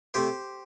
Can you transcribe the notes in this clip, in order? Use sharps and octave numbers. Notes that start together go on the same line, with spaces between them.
C3 A3 G4 C5